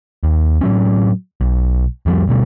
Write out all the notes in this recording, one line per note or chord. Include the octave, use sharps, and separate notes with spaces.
D#2
A2 F#3 C#4
B1
F2 F3 G3
D2 B2 G3